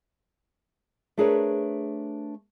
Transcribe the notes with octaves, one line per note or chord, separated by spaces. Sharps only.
A3 D4 G#4 A#4 B4 C#5